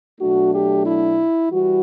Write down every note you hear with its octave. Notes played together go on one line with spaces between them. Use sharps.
B2 F#3 A3 D4 F#4
G4
E4
E3 G3 F#4